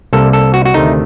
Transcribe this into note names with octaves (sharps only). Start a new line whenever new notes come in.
C2 C3 G3 A#3 A4
A4
F#4
F#4
D2 C3 D#3 A3 D#4